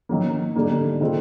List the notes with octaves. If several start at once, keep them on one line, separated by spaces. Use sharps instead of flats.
D#3 F#3 A#3
D3 G3 A#3 D#4
C3 D#3 G#3 C4 F4